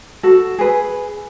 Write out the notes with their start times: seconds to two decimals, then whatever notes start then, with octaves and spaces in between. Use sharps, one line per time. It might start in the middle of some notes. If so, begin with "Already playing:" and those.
0.23 F#4 A4
0.58 G#4 B4